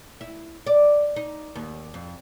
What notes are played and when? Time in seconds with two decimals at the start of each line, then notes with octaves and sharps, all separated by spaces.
0.21 E4
0.67 D5
1.16 D#4
1.55 D#2
1.94 F2